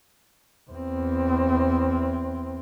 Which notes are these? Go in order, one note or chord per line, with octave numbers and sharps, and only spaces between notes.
E2 C4